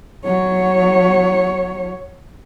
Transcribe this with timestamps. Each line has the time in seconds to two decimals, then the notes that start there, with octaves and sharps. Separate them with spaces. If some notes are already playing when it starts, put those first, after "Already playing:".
0.25 F#3 C#5